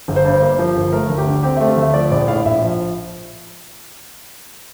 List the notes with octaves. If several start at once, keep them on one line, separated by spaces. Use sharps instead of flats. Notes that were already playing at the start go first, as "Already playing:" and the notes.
G1
C5
G2
A#3
F3
G1
A3 A#4
D2
G4
D3
C4 G4
A3 E5
F5
D2 E5
F3 D5
A#1 D5
A2 F5
A#1 E5
F3